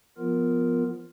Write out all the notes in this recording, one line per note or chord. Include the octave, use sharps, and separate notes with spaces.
F3 B3 F4 A#4